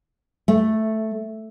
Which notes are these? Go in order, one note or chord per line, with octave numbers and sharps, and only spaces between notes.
A3